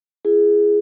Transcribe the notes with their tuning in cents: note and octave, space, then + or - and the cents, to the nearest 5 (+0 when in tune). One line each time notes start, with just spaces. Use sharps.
E4 +35 G#4 +0